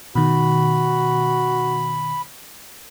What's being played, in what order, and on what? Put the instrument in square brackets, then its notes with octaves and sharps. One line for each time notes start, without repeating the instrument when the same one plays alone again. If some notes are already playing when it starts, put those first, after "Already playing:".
[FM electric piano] B2 D#3 [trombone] F#4 [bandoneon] B5